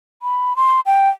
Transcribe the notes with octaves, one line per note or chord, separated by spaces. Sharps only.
B5
C6
G5